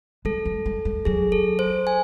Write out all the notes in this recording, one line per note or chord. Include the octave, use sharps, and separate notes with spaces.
G#3 A4
F#3
G#3
G#3
F#3 G#4
A4
C5
G#5